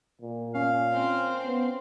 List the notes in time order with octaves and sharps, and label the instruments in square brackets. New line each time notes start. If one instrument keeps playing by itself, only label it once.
[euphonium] A#2
[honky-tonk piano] C#4 [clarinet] F5
[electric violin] C4 C5
[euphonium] B3